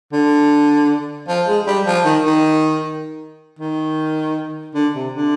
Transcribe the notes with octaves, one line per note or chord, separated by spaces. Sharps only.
D3
F3
G#3
G3
F3
D#3
D#3
D#3
D3
C3
D3